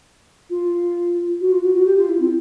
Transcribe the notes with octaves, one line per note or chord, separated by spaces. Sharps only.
F4
F#4
F4
F#4
F#4
G4
F4
E4
C4